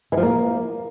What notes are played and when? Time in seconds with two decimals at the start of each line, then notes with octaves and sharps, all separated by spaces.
0.12 E3
0.17 F3
0.23 A#3